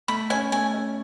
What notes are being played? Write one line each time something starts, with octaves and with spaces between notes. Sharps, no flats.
A3 B5
C#4 G#5
A3 G#5
C#4